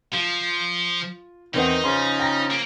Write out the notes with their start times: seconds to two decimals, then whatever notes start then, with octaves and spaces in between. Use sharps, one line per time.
0.13 F3 F4
1.54 E2 D#3 C4 D#4 F#5
1.84 C#3 F3 C6
2.19 G5 A#5 A#6
2.50 A#3